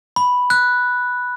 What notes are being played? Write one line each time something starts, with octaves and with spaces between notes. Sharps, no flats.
B5
F#6